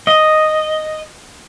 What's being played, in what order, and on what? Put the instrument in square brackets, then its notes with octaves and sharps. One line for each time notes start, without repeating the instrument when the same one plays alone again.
[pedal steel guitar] D#5